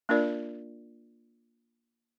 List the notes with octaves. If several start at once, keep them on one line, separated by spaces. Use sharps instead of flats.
A#3 D4 F4 A#4 D5